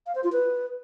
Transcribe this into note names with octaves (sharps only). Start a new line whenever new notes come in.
F5
C5
F4
B4